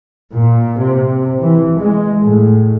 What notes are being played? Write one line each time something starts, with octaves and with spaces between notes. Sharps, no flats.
A#2
C3
E3
G#3
A2